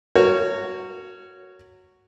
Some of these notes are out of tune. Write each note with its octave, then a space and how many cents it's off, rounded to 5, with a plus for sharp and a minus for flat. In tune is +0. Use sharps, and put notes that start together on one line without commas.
F#4 +0 A#4 -30 C#5 +0